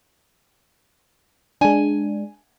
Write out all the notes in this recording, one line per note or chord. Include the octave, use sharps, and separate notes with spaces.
G#3 D4 G#5